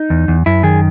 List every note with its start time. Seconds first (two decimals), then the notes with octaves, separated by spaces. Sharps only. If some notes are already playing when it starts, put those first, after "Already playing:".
Already playing: D#4
0.10 E2
0.28 E2
0.46 F#2 E4
0.63 D#3 G#4